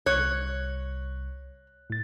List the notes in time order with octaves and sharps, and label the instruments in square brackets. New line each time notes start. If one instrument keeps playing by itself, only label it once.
[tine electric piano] C2 [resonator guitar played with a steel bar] C#5 [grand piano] F#6
[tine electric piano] A2 A6